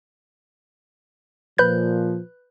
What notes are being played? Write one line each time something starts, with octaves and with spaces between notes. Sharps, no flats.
A#2 F3 B4 F#6 G6